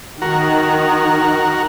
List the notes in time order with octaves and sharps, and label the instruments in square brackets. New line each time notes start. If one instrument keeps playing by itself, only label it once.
[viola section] D#3 [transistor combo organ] F#4 A#4